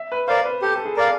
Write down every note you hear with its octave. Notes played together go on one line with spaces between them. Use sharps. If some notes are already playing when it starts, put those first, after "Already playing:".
Already playing: E5
B4
A#4 C5 D5 F5
B4
G4 A4
A4
G#4
A#4 D5 F5